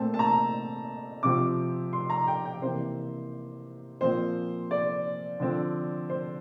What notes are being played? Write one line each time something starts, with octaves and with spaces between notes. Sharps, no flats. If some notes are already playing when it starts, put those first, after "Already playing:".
Already playing: A#2 A3 C4 A5
A5
A#5
C3 F3 C4 D6
C6
A#5
G5
G5
C3 E3 A#3 C5
A#2 F3 C4 C5
D5
D3 F3 C4
C5